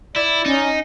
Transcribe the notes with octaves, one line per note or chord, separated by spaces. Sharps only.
E4 D5
C#4 D#4